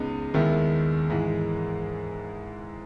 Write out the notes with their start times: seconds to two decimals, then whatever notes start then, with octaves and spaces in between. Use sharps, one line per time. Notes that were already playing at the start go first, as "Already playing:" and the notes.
Already playing: C#2 C#3 G#3 B3 D#4
0.34 D#2 D#3 G#3 B3 E4
1.10 G#2 E3 G#3